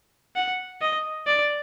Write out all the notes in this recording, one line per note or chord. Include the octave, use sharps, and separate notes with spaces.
F#5
D#5
D5